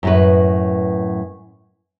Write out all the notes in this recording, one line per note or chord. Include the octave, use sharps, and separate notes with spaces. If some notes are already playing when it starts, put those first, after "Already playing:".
F#2 A2 B4